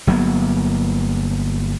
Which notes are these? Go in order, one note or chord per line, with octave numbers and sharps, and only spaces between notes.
G1 F#3 A#3 B3